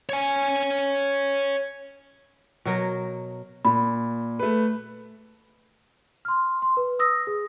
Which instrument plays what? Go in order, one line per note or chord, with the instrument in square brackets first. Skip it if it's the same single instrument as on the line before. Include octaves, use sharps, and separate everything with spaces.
[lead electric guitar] C#5 G#5
[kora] B2 F#3 A#4
[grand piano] A#2 [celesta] B5
[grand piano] A3 B4
[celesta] C6 F6
C6
B4
D#6 E6 A#6
G#4